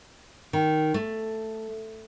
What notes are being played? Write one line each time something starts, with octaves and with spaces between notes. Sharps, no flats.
D#3
A3